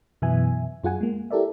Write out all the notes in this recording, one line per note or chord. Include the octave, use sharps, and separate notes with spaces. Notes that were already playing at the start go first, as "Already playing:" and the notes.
F#2 B2 E3 B3 E5 G#5
F#2 F4 G#4 F#5 G#5
G#3 A#3
E4 G4 A4 A#4 D5 E5